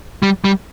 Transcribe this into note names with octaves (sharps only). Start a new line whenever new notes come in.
G3
G3